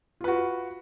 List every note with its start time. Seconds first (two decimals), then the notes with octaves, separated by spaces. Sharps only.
0.21 F4
0.24 B4
0.28 F#4